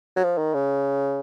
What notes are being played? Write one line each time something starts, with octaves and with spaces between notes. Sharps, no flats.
F#3
F3
D#3
C#3